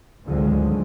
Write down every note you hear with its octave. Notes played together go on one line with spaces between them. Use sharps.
G#1 D2 D3 F3 F#3 G#3